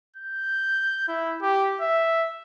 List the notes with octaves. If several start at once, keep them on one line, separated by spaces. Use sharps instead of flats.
G6
E4
G4
E5